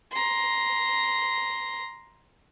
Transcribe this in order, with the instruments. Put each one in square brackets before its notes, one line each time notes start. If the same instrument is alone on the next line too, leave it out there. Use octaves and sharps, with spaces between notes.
[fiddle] A#5 C6